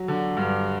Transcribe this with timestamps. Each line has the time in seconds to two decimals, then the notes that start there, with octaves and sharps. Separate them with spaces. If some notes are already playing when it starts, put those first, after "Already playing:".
Already playing: F#3
0.08 D3
0.37 G2